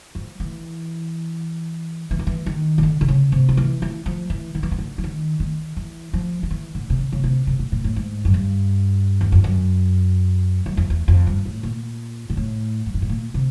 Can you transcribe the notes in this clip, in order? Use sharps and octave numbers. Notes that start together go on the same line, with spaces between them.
F3
E3
E3
D#3
E3
D#3
C#3
D3
D3
C#3
C3
D#3
E3
E3
F3
E3
D#3
E3
D#3
D3
E3
D#3
D#3
E3
F3
D#3
E3
D3
C3
C#3
C#3
C3
C3
B2
A#2
A2
G#2
F#2
G2
E2
F2
F#2
F#2
F2
E2
F2
G2
A2
A#2
A#2
A2
G2
G#2
A2
A#2
C3